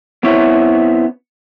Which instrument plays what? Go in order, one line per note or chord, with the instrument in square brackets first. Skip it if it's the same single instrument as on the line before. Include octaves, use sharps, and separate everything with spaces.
[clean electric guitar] B3 C4 E4 C#5